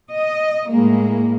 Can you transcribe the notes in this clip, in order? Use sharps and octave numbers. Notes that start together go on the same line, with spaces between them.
D#5
A2 G#3 A#3